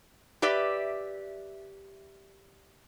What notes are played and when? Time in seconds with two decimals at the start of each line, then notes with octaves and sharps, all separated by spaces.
0.42 G4 B4 D5 E5